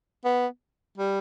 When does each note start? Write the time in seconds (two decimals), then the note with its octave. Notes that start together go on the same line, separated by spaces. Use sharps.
0.25 B3
0.98 G3